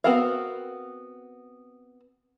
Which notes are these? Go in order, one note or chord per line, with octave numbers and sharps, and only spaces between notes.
B3 C4 F#4 A#4 F5